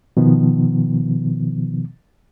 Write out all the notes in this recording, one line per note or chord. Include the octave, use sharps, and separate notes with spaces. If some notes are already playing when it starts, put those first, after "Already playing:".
B2 D#3 F3 B3